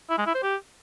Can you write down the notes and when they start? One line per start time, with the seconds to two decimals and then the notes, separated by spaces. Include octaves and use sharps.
0.10 E4
0.18 G#3
0.26 E4
0.35 C5
0.43 G4